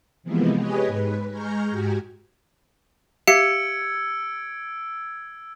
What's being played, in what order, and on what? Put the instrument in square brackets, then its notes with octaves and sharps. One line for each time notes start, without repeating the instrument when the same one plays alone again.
[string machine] C3 E3 F3 G#3 A#3 B3
G4 G#4 B4 C#5 D#5 G#5
G#2 B4
G#3 G#5 A#5 C#6 F6 G6
G#2 F#4 G4 G#5
[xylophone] G4 E5 F5 [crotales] E6 G#6 D7 [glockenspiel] C#7